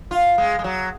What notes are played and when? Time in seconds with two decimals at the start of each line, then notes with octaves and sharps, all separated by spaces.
0.11 F4
0.38 G#3
0.59 G#3
0.64 F#3